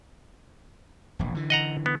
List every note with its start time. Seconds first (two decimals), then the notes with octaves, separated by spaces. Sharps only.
1.19 E1 A#1
1.35 D3 E3
1.50 D#5 F#5 A#5
1.86 B3